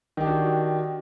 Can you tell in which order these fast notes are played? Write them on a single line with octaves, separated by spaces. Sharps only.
D#3 G4 D4 F#4